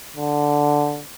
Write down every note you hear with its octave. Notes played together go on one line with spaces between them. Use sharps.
D3